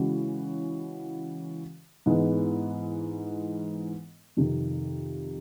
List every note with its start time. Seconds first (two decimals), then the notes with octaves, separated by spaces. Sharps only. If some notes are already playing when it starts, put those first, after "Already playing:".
Already playing: C#3 E3 G#3 C#4 F#4
2.06 G#2 E3 G#3 B3
4.37 F2 C3 D#3